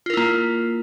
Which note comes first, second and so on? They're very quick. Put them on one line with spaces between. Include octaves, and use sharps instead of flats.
F4 A#4 E4 A#3